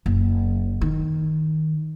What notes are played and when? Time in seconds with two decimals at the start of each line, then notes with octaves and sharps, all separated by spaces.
0.06 F#1
0.81 D#3